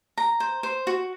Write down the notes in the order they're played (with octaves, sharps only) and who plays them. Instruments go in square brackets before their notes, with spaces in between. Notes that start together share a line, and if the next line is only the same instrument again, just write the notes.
[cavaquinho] A#5
C5
C5
F#4